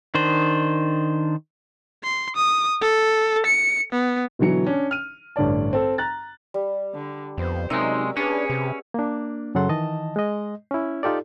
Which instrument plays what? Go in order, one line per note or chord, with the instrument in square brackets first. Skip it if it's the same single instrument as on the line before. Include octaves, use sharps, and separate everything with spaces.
[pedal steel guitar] D#3 D4 C5
[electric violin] C6
D#6
A4
C#7
B3
[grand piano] B2 D3 E3 F#3 C#7
C#4 D4
F6 D#7
A1 G2 D3 C#5 D5 A5
C4 A4
A#5 F#6 A6
[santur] G3
[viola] D3
[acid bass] F2 [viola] B3 C5
[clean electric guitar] C3 G#3 [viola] F#3 C#4 [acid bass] D#4 [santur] A#4 E5
[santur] B3 [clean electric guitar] C#4 [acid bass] D4 [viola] G#4 B4
[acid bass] C3
[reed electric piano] A#3 D4
F#2 C#3 F#3 A4 F#5 C6
D#3 E3 D#5 A5
G#3 D#5
C#4 E4
D#4 F4 G4 A4 D5